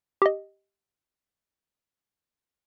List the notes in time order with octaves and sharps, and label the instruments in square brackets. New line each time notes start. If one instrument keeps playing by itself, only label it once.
[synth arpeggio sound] G4 D#5